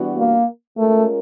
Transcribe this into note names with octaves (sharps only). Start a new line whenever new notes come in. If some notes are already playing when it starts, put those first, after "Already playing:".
Already playing: E3 G3 B3 D4 F#4
A#3
G#3 A3 C#4 F4 A#4